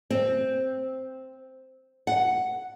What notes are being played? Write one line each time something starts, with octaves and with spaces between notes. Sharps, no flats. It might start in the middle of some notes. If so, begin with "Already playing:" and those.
C4
F#5